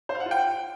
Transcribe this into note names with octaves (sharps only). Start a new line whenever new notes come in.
C5
F5
F#5
F4
G5